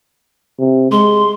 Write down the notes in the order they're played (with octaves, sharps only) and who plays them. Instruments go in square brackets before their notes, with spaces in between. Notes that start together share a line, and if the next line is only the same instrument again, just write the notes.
[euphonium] C3
[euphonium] G#3 [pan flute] C6